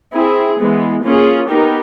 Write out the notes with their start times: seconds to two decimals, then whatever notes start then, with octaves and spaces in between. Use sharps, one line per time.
0.13 C4 E4 G#4
0.59 E3 G#3 B3
1.04 A#3 C#4 F4 G#4
1.49 B3 D#4 G4 A#4